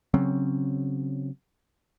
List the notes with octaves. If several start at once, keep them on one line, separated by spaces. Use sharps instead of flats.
C#3 F#3 C4 C#4